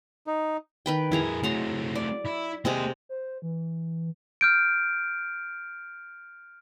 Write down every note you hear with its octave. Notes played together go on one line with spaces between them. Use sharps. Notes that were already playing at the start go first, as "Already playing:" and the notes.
D#4
D#3 B4 G5
F2 E4 G#4 A#4 A#5
F#3 A3 C4 A#5 C6
D5
E4
C3 G#3 A#3 C4 D#5
C5
E3
F6 G6 D7